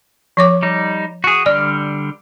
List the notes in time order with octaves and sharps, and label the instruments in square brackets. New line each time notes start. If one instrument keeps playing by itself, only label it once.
[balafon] F3 C#5 D6
[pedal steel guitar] G3 D#4
F#4 G#4
[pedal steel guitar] D3 G3 F6 [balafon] D5